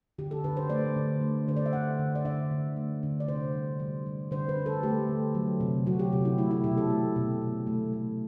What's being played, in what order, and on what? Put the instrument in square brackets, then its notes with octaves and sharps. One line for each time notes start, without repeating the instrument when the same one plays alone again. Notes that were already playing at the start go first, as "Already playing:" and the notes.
[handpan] D3 G4
A4
D3 B4
C5
A3 D5
D3
A3
D3 C5
D5
E5
D3 F#5
D3
D5
D3 E5
D3
A3
D3
D5
C3 C5
G3
G3
G3
D3 C5
B4
D3
A4
A3 G4
D3
F#3
C3
F#3 F#4
G4
C3 F#4
E4
A3 E4
E4
B2 G4
A4
A3
B2
B2
A3
A3